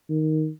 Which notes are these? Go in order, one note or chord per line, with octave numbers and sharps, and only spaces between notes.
D#3